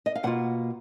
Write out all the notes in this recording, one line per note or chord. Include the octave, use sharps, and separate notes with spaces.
D#5
F5
B2 A#3 F4 F#5